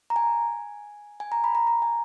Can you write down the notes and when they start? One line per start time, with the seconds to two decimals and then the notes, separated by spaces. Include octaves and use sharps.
0.10 A#5
0.16 G#5
1.20 G#5
1.32 A#5
1.44 B5
1.55 A#5
1.67 A#5
1.82 G#5